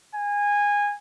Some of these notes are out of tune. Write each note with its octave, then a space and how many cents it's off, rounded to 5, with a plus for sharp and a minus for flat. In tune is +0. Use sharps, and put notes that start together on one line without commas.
G#5 -20